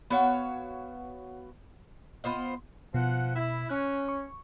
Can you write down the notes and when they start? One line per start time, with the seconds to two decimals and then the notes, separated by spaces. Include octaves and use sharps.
0.10 B3 F#4 C#5 F5
2.24 B3 F4 C5 D#5
2.94 B2 F3 F#5
3.36 E4
3.69 C#4 F#6
4.09 C#6